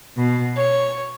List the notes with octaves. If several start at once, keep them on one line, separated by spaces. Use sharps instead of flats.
B2
C#5